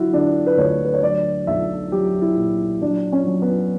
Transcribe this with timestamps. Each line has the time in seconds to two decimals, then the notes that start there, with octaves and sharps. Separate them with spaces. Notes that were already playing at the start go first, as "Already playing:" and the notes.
Already playing: D3 F#3 E4 F#4
0.12 D3 D4
0.47 B4
0.57 D2 C#5
0.84 B4
0.94 C#5
1.02 F#3 D5
1.47 B1 E5
1.92 F#3 G4
2.22 E4
2.37 A#2
2.82 F#3 D4
3.12 C#4
3.26 F#3
3.42 B3